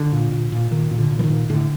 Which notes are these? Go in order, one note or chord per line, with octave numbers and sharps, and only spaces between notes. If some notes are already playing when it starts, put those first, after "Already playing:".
Already playing: D3
A#2
A#2
A#2
A#2 D#3
A#2
D3
A#2
E3
D#3
A#2
A2 D3